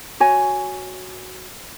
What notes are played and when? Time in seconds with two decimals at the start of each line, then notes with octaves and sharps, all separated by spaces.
0.20 F#4 C#5 G#5